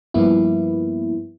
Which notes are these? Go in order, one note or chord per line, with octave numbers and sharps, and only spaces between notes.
G2 F3 A#3 B3 E4